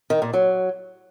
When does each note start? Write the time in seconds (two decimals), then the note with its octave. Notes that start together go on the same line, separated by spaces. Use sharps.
0.10 D#3
0.22 A#2
0.33 F#3